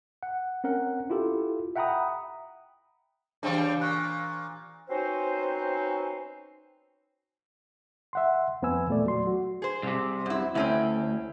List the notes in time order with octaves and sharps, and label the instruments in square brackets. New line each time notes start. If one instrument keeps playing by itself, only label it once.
[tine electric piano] F#5
C4 C#4 A#4 F#5
E4 F4 G4 A4
E5 F#5 G5 A#5 B5 D#6
[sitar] C#3 G3 C4 [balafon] E3 D4
[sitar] A#2 [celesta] C#6 F#6
[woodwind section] C4 C#4 D#4 F#4 B4 C5
[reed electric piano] E5 F#5 C6
F2 B3 C4 B4 G#5 E6
E2 A#2 A3 D5
F#3 C6
F#4
[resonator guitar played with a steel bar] G#4 C5
[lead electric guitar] C2 C3
[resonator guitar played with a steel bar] F#2 E4
[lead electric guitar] D2 [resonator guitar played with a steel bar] C4 C#4 E4